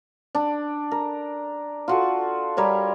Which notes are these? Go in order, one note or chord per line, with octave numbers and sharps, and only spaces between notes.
D4
A#4
F4 F#4 A4
G3 A#4 C#5